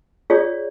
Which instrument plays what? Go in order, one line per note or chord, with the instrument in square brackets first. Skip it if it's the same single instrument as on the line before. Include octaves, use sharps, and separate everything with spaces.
[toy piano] F4 G#4 C#5 D5